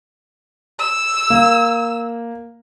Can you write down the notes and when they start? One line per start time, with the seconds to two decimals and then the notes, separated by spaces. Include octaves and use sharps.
0.80 E6
1.30 A#3